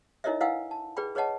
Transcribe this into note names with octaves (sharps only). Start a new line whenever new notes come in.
D#4 E4 A#4 C#5 D#5 E5
E4 B4 F5 F#5 G#5 E6
A5
G#4 B4 D5 G5 B5
G#4 B4 C#5 D#5 F#5 A5